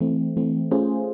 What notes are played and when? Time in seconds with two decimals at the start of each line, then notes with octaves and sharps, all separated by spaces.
0.01 E3 A3 C4
0.37 E3 A3 C4
0.71 A3 C#4 F4 G#4 C5